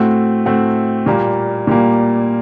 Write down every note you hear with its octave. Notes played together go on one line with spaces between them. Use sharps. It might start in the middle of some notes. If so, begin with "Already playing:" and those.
Already playing: A2 A3 C4 F#4
A2 A3 C4 F#4
A#2 G3 A#3
A#2 G3 A#3